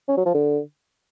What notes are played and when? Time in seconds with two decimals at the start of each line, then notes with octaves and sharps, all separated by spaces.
0.09 C#4
0.17 F#3
0.26 F3
0.34 D3